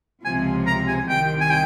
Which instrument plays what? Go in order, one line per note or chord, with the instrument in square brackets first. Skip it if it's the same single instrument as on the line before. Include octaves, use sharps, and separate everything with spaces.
[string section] C#2 C3 F3 [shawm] G#5
[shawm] A#5
G#5
[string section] C2 C3 D#3 [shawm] G5
[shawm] G#5
G5